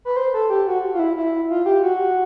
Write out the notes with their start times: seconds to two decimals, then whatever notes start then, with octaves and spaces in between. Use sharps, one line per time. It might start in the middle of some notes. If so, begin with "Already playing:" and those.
0.05 B4
0.17 C5
0.34 A4
0.50 G4
0.67 F#4
0.94 F4
0.99 E4
1.17 E4
1.50 F4
1.66 G4
1.83 F#4